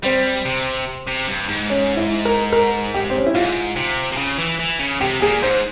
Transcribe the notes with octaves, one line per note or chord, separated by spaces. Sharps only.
G3 C4
C3
C3
G2
G#2
C#4
E4
A#4
A#4
G4
C4
C#4
E4
G#2 F4
C3
C3
C#3
E3
E3
C#3
C3 G4
A#2 G#4
G#2 C5